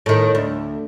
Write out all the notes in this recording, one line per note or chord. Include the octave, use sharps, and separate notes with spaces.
A2 D#3
D2